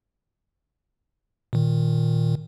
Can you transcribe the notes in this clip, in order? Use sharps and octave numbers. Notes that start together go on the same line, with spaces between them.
A#2 D#3